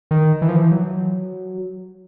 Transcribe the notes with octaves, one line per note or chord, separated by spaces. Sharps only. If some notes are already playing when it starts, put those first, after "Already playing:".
D#3
E3
F3
E3
F#3